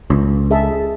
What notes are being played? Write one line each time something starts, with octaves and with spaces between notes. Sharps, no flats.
C#2
G#4 E5 A5